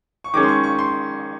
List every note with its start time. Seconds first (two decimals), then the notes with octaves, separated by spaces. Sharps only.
0.24 C#6
0.34 D#3 G#3 C#4 D6
0.43 C6
0.48 C#6
0.64 C#6
0.79 C6